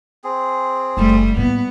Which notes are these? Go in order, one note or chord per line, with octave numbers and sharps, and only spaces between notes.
C4 G#4
F#1 G3 A3
A2 A#3 B3